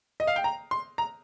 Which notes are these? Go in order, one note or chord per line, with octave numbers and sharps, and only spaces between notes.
D#5
F5
G5
A#5
C6
A#5